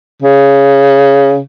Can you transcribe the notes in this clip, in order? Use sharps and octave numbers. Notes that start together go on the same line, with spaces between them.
C#3